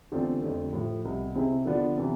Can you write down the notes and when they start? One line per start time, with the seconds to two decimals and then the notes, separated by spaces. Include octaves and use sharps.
0.12 E2 D3 A3 C4 F4
0.42 F2 D3 A3
0.73 A2 F3 A3
1.05 C2 B2 B3
1.36 C3 G#3 C4 E4
1.65 D3 F3 B3 D4 F4
1.98 C3 E3 B3